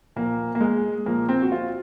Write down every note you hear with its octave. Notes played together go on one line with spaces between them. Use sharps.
A#2 F3 A#3
A#3
G#3
A#2 F3 A#3
C4
F#4
F4